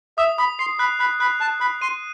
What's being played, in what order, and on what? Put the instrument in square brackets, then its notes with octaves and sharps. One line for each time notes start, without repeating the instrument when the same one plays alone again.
[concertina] E5 [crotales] D#6
[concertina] B5 [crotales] D#6
[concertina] C6 [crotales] C7
[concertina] B5 [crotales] F#6
[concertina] B5 [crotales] F#6
[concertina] B5 [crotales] F#6
[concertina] A5 [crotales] F#6
[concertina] B5 [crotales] F#6
[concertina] C6 [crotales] D#7